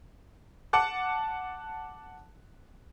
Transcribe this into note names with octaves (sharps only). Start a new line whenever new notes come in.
F#5 A5 D6 F#6